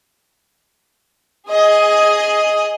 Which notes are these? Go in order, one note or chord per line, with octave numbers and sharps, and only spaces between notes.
G#4 D#5